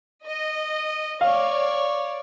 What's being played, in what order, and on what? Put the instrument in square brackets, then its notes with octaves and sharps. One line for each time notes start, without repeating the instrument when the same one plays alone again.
[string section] D#5
[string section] C#5 D5 [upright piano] F5